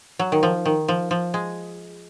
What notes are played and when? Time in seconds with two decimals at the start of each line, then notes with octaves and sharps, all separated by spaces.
0.19 F#3
0.32 D#3
0.43 F3
0.65 D#3
0.88 F3
1.11 F3
1.34 G#3